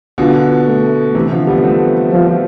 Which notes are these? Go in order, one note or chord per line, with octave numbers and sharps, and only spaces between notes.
B2 D3 F4
A3
C3 E3
D3 F3
G3 B3
A3 C4
F3